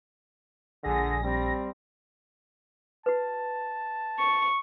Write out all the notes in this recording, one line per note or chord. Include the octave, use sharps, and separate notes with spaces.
A#1 D3 G#4 A#6
G3 C4
F#4 B4 A5
C#6